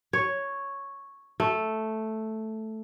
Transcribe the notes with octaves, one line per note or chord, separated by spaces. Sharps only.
C#5
A3